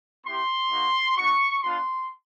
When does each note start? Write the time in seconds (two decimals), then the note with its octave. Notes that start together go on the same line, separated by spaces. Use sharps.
0.24 B3 E4 G4 C6
0.71 A#3 D#4 F#4
1.17 B3 D#4 F#4 C#6
1.63 B3 D4 F4 C6